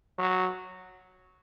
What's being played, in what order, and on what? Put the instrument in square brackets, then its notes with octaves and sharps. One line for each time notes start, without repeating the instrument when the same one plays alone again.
[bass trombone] F#3